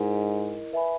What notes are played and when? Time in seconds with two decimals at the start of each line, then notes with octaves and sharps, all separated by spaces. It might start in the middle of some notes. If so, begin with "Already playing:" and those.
Already playing: G#2 E4 A#4 D#5
0.73 B4 E5 G#5 B5